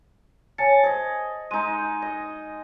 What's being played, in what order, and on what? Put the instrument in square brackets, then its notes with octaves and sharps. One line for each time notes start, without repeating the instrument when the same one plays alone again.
[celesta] C#5 G#5 C#7 [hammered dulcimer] A5
[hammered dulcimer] G#4 D#5 [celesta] C5
[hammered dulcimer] G#3 D#4 [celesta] D#7
[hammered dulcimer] D#5